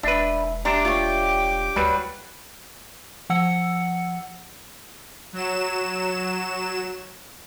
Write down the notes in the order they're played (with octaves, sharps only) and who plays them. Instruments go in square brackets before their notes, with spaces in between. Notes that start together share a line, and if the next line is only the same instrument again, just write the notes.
[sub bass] E1 [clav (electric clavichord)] D4 B4 [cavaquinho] E5
[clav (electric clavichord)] D4 E5 [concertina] G4 G5 D6 [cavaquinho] A#5 C6
[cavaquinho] F4 C#5
[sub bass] D2 [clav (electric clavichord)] F#3 G3 [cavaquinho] B4
[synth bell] F3 F#5 E6 C#7
[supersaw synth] F#3 E7